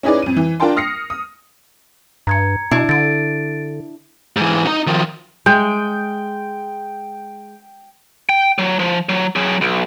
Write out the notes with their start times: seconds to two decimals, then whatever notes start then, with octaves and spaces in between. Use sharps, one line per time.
0.03 C#4 D#4 E4 G#4 B4 D5
0.22 F2 D#7
0.37 E3
0.60 D4 F4 A#4 G5 A5 C6
0.76 D#6 F6 A#6 C7 C#7
1.10 D#6
2.27 G2 A#5 G#6 C#7
2.71 B2 D4 E4
2.89 D3 A6 D7
4.36 G#2 E3
4.67 D#4 A#5
4.87 D#3 F3
5.46 G#3 G5
8.29 G5
8.58 F#3
8.79 F3
9.09 F#3
9.36 F#3 G#4
9.61 B1